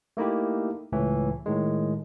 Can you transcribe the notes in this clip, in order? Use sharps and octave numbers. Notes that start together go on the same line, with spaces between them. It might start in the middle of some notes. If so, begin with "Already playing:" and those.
A3 A#3 D#4 E4 G4
C#2 A2 E3
A2 D#3 G#3